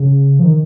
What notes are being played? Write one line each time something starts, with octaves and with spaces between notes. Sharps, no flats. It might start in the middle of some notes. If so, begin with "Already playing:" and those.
Already playing: C#3
F3
D#3